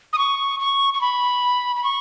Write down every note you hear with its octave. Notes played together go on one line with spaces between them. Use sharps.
D#6
C#6
C#6
C#6
B5
B5
C#6